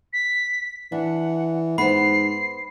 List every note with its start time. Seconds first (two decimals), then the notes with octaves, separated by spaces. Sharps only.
0.13 B6
0.92 E3 D4 F#5
1.78 G#2 B3 C5 B5 C7